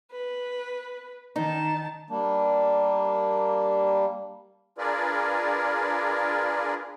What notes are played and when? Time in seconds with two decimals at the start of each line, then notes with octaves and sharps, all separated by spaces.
0.12 B4
1.36 D#3 D#4 A5
2.10 G3 A#3 D4
4.78 D4 F4 G#4 A#4 B4 D5